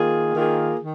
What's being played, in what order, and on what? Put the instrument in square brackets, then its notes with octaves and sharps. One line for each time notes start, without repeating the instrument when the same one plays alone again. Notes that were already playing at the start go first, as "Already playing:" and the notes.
Already playing: [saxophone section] D#3 A#3 F4 G#4
D#3 A#3 F4 G#4
D#3